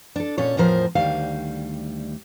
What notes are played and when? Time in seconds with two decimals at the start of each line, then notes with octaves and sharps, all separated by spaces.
0.16 D4 A4
0.38 A#2 C#4 A4 C#5
0.57 E2 A2 F3 A#4 C5
0.95 D2 D#3 G3 F5